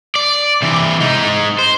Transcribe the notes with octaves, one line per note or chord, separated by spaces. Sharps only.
D5
C3 E3
G#3 D#4
C5